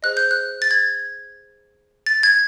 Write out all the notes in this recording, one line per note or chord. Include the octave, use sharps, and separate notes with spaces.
G#4 C5 D#5 F#6
G6
F#6
A6
G#6
A6
G#6